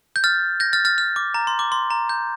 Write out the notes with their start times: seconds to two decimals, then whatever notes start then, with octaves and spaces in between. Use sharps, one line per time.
0.16 G6
0.24 F6 A6
0.60 G6 A#6
0.73 F6 A6
0.85 F6 A6
0.98 F6
1.16 D6
1.34 A#5
1.47 C6
1.59 D6
1.72 C6
1.91 A#5
2.09 G6